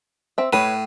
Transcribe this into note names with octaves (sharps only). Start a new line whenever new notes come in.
C4 E5
A2 B4 C#5 D#6